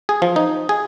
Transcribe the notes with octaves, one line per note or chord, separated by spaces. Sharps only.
G#4
F3
D#4
G#4